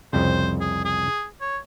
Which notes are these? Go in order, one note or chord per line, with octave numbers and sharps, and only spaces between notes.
C2 F2 C#3 C5
G#4
G#4
C#5